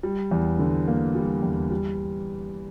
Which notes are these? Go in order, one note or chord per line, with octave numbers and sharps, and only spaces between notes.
G3
E2
D3
A#3
G3
E2
G3